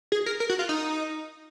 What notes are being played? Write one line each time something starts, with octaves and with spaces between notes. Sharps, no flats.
G#4
A#4
A#4
F#4
F4
D#4